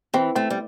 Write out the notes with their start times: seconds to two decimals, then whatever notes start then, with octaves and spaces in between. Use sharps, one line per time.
0.14 E3 C4
0.35 A3 C4
0.50 G3